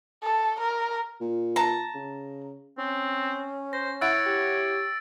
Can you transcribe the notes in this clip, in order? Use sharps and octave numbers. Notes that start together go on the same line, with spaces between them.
A4
A#4
A#2
A5 A#5
C#3
C4 C#4
C5 A#6
E4 C#5 F#5 E6 A6 D7
G4 A6